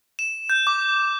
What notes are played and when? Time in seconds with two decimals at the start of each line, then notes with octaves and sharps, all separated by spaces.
0.19 E7
0.50 G6
0.67 D6